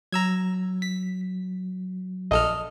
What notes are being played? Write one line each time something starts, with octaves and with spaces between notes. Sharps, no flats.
F#3 A#5 E6 G#6
B6
A#1 A4 D#5 F6